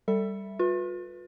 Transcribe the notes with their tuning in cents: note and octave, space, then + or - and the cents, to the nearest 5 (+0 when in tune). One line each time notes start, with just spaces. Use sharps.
G3 +0 A4 +20 E5 +0
F4 +45 B4 +0